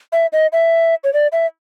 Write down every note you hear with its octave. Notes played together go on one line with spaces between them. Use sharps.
E5
D#5
E5
C#5
D5
E5